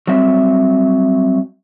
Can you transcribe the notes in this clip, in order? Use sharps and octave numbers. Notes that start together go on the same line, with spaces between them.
F#3 G3 C4 E5